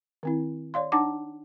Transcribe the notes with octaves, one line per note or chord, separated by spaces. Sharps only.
D#3 C4 E4
C#5 D5 F5 C6
D4 D#4 F#5 A5 D6